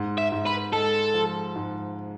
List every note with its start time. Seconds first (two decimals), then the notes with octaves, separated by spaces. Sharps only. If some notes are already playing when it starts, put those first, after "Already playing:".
Already playing: G#2
0.18 E5
0.32 G#2
0.46 B4
0.72 G#3 A4
1.14 F3
1.55 G#2